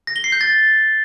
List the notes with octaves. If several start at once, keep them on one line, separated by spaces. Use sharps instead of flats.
A#6
G7
C7
G6
A6